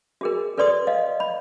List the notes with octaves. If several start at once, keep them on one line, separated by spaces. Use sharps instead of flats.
F#4 G#4 A#4
A4 B4 D5 C6 D#6
D#5 F5
B5